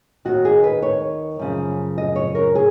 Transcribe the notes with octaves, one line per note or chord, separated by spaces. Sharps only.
D#2 D#3 F#4
G#4
B4
C#5
F#2 C#3 F3
D#5
C#5
A#4
G#4